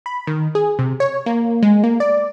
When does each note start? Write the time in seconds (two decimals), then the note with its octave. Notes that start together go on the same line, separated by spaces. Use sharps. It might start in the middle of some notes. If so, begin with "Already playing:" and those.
0.06 B5
0.27 D#3
0.55 G#4
0.79 C3
1.00 C#5
1.26 A#3
1.63 G#3
1.84 A#3
2.00 D5